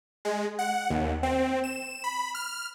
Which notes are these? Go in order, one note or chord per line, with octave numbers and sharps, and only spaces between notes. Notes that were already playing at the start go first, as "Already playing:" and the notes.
G#3
F#5
D#2
C4
E7
B5
F6